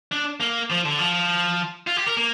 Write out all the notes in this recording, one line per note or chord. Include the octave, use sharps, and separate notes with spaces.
D4
A#3
F3
D3
F3
F4
G4
A#4
A#3